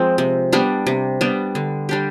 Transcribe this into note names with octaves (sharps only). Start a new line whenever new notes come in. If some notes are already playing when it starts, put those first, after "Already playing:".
Already playing: F3 G#3 C4
C3
G3 B3 D4
C3
G3 B3 D4
D3
G3 D4 G4